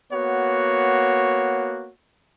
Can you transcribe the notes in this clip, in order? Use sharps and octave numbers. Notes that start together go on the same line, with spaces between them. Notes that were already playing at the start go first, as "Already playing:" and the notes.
A#3 B3 F#4 C#5